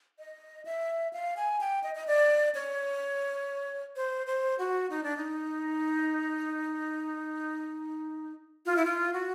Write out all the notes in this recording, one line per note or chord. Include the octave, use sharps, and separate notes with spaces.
D#5
E5
F5
G#5
G5
D#5
D#5
D5
C#5
C5
C5
F#4
D#4
D4
D#4
F4
E4
F4
F#4